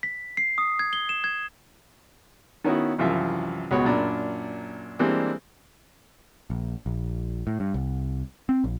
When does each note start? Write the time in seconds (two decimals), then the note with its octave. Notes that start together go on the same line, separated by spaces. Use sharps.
0.03 B6
0.37 C7
0.58 D#6
0.79 G#6
0.93 G7
1.09 E7
1.24 G#6
2.64 D#3 B3 C#4 E4 F#4
2.98 C2 F#2 E3 F3 F4 E5
3.71 C#2 B2 B3 C#5 B5
3.85 F#2 A#2 D4 A#5 B5
4.99 E3 G3 G#3 A#3 C4 D4
6.50 A#1
6.86 A#1
7.47 A2
7.60 G2
7.74 C2
8.49 C4
8.64 A#1